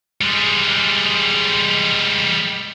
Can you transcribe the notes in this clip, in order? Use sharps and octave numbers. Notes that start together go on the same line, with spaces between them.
G3 G#3